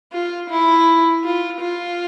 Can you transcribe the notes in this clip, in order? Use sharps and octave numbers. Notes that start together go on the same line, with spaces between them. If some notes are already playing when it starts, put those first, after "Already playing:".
F4
E4
F4
F4